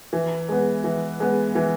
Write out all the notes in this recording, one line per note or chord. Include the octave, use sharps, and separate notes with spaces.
E3
G#3 B3
E3
G#3 B3
E3